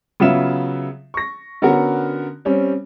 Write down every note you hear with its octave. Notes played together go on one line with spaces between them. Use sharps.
C#3 F#3 B3 F4 E5 E7
C#6 A#6
D3 B3 C#4 F#4 A#4
G3 C4 C#4